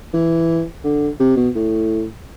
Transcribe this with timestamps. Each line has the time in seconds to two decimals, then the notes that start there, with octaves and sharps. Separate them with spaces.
0.14 E3
0.84 D3
1.20 C3
1.37 B2
1.55 A2